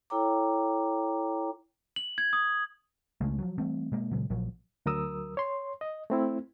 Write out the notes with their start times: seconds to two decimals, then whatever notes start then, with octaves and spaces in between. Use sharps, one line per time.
0.10 E4 A4 C#5 G5 A#5 D6
1.96 F#7
2.18 G#6
2.33 D#6
3.21 C#2 C#3 G#3 A3
3.39 F3 F#3
3.58 E3 G3 A3 C4
3.92 B2 G#3 A#3
4.11 A#2 C#3 F#3 G#3
4.30 A#1 A#2 F3 F#3
4.86 D2 F#3 A#4 D#6 E6
5.37 C#5 C6
5.81 D#5
6.10 A3 C4 E4